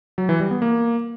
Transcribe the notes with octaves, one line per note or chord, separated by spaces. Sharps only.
F#3
E3
G3
B3
A#3